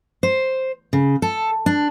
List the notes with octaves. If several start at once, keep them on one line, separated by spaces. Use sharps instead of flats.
C5
C#3
A4
D4